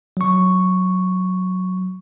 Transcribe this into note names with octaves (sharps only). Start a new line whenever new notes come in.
F#3 C#6